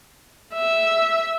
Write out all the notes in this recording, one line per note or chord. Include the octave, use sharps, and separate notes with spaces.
E5